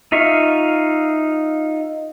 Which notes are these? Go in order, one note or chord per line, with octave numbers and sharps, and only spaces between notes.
D#4 F4 E5 F5 C#6